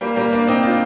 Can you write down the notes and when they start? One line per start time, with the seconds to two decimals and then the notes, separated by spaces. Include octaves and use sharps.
0.01 G3 A#3
0.16 G3 A#3
0.33 A#3 D4
0.47 C4 D#4
0.63 D4 F4